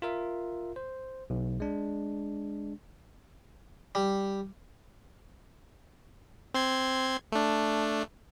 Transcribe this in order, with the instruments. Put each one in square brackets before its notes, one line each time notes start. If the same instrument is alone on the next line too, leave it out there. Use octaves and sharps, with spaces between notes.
[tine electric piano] F4 A#4 E5
C5
B1
G#3 D4
[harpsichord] G3
[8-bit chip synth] C4 C6 G#6
A3 D4